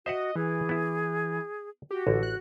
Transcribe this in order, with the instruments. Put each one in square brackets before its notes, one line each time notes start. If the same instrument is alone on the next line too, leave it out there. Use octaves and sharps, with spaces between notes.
[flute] F#4 [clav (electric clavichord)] C5 E5 F#5 [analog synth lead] D#5
[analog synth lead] E3 [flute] G#4
[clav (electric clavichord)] B3 E4
[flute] F#4 [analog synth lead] G4
[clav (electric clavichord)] A1 [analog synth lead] D3
[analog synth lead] F#6